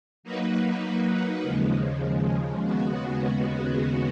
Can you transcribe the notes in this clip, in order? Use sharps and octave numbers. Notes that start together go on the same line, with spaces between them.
F#3 A#3 D#4 F#4 B4
D#2 C#3 F3 G#3
D#2 C#3 G#3 B3 F#4